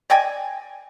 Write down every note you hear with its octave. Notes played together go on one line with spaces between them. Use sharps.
D5 D#5 G5 G#5